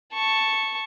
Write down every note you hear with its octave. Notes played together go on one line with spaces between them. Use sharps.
A5 C#6